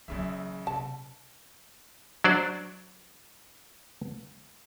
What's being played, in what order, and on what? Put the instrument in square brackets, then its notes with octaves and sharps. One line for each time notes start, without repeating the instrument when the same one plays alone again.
[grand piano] A#1 C#3 E5 [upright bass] E3 F#3
[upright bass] C3 [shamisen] A5
[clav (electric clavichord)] F#3 D4 C5 D5